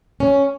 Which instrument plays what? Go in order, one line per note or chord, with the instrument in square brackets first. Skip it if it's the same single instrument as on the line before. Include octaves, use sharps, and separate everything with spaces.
[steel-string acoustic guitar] C#4